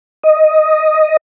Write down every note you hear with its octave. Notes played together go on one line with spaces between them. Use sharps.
D#5